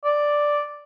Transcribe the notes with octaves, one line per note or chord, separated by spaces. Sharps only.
D5